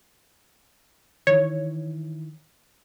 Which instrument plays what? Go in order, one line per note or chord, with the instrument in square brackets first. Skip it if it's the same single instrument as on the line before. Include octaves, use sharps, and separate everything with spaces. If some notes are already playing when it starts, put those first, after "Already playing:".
[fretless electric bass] D#3 E3 [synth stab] C#5